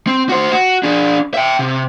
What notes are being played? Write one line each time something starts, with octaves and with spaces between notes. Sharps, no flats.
C4
F#4 C5
F#4
D4 G#4
E5 G5
C3